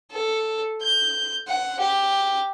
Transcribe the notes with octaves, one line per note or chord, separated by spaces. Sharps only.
A4
G6
F#5
G4